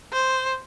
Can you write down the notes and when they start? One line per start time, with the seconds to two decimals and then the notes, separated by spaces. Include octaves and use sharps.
0.12 C5